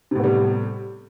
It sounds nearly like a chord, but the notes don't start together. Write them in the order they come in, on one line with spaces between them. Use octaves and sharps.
C3 A2 B3 G3